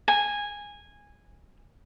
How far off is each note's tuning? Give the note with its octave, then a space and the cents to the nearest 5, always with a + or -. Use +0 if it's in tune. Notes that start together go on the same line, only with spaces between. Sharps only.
G#5 -15